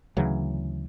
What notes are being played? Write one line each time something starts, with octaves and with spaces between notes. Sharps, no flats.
D2 C#3 E3 F#3